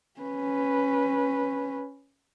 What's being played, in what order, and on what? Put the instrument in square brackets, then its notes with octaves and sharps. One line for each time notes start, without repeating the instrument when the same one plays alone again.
[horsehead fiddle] C#4 B4